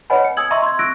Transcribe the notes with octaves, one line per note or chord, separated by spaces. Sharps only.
B4 C#5 D#5 F#5 G#5 B5
C#7
G#5 D#6 E6 G#6 F#7
D#5 E5 A#5 C6 C#6 E6
C6 G#6
C#6 E6 F#6 A#6 D7